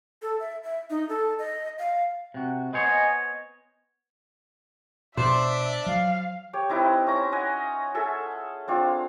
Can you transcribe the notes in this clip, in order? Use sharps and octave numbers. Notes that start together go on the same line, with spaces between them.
A4
E5
E5
D#4
A4
D#5
F5
C3 F#4
B3 C5 C#5 D#5 G#5
B2 D4 C5 D5 E5
F#3 F5
G4 C#5
C4 D#4 E4 B4
C#4 A#5
C#5 D#5 F#5 G#5
G#4 A4 E5
C4 D4 F4